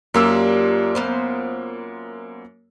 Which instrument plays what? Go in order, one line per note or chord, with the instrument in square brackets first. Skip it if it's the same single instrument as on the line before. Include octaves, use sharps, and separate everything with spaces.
[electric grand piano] F#2 A#3 E6 [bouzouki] D4 F4 G4
[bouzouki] B3 F4 C5